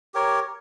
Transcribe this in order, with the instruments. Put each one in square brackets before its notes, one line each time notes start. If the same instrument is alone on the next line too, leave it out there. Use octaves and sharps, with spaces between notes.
[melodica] G4 A#4 C#5